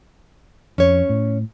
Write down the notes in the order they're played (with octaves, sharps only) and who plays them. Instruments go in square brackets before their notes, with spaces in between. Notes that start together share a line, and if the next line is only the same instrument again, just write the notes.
[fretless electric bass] F2 [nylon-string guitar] C#4 C#5
[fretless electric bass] A2